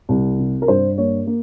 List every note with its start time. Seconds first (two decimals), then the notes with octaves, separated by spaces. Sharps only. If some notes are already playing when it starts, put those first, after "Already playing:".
0.09 C2
0.39 C3
0.62 A#4
0.68 G2 C5
0.98 A#3 C#5
1.27 A#3